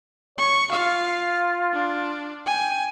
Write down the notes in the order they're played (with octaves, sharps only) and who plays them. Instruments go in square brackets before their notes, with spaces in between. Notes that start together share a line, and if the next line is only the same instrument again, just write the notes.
[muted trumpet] C#5 [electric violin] C#6
[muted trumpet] F4 [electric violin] F5
[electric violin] D4
[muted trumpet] G5 [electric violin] G#5